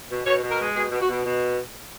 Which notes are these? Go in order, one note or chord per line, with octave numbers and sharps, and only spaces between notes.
B2
B2 C#5
B2
A#4
G#3
B2 G#4
B2
F#4
B2
B2